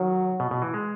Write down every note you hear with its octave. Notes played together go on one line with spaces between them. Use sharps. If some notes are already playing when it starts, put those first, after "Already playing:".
Already playing: D#3 F#3
B2
B2
E3
G#3